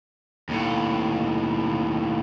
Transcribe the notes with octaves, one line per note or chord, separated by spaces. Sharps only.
D#2 A2